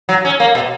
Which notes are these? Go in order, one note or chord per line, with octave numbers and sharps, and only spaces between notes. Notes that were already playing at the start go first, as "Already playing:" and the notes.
F#3
C#4
A#3
B2